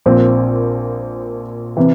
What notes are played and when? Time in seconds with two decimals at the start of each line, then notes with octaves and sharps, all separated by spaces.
0.06 A#1 A#2 F3 C4
1.77 C3 E3